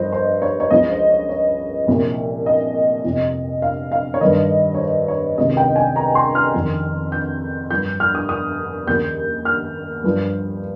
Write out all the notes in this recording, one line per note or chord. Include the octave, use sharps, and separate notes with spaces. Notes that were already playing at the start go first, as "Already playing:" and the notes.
Already playing: G2 F3 C5 C#5 D#5
C5
C#5
C#5
C#2 C#3 F3 D#5
C5
C#5
C#5
C2 A#2 F3
D#5
F2 C3 F3
F5
F5
C#5
G2 D#3 D#5
C#5
C5
C#5
C#2 C3 D#3 D#5
G5
G#5
A#5
C6
F6
F2 D#3
G6
G2 F3 G6
F6
D#6
D#6
D#2 C#3 F3 G6
F6
G2 F3